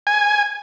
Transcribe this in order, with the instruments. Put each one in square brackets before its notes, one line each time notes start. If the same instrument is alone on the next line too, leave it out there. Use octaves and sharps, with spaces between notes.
[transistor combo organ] G#5